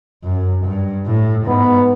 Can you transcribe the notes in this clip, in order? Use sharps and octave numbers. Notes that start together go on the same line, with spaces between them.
F#2
G2
A2
G#2 B3